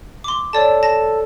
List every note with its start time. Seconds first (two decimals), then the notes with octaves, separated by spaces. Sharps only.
0.24 C6 D6
0.53 A4 C#5 D5 A5
0.83 A5 A#6